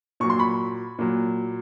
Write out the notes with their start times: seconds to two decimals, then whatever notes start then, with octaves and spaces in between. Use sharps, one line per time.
0.20 A#2 F#3 C#6
0.30 C6
0.39 B5 C#6
0.99 A#2 F#3